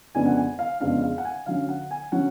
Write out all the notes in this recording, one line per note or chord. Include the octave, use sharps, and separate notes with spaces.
F2 C#3 G#3 B3 D4 G#5
F#5
G#5
F5
F2 C#3 G#3 B3 D4 F5
F5
F#5
G#5
D3 F#3 C#4 F5
F#5
G#5
D3 F#3 C#4 F#5